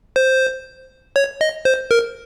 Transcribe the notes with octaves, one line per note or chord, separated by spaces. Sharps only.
C5
C#5
D#5
C5
A#4